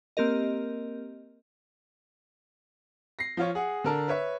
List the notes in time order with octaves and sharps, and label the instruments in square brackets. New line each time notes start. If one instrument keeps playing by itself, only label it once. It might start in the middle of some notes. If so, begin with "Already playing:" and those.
[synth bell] A#3 C4 G4 A#4 D#5
[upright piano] A#6 C7
F3 F4 C#5
G#4 F#5
D3 A#4 A5
B4 C#5 E5